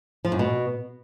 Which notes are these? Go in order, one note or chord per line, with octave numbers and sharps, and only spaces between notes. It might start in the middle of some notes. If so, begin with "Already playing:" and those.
F3
F#2
B2